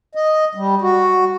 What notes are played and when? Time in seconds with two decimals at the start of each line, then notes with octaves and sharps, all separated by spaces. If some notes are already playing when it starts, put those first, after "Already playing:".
0.15 D#5
0.55 G3
0.82 F#4